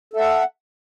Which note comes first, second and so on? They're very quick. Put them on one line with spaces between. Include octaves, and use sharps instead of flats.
A4 E5 F#5